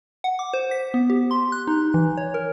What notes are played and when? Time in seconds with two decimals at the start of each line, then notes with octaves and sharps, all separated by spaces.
0.24 F#5
0.39 D6
0.53 C5
0.71 B6
0.94 B3
1.10 G4
1.31 C6
1.52 F#6
1.67 D#4
1.94 E3
2.17 C#5
2.34 A#4